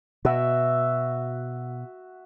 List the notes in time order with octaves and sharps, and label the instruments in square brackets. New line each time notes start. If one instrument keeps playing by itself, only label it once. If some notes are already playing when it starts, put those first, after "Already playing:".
[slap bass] B2 [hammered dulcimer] F#4 E5